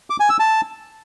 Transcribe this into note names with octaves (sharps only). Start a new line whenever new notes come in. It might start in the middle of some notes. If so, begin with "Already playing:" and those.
D6
G#5
E6
A5